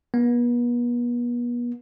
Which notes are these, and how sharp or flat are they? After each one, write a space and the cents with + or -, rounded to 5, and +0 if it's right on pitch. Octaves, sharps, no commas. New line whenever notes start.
B3 -40